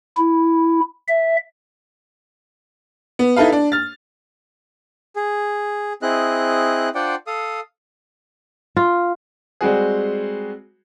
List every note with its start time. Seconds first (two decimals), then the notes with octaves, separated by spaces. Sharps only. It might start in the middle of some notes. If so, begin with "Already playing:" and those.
0.17 E4
1.08 E5
3.19 B3
3.36 D#4 E4 A4 B4 F5
3.52 D4
3.72 F6 A6
5.16 G#4
6.02 C4 E4 G#4 D#5 F#6
6.95 D4 F4 C5 D5 F#5 G5
7.27 A4 F5 D#6
8.76 F4
9.61 G3 G#3 C4 F#4 G#4